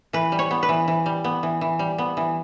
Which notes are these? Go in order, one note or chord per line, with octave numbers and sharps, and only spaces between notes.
E3 B4
G3
C#5
B3
B4
E3
E3
G3
B3
E3
E3
G3
B3
E3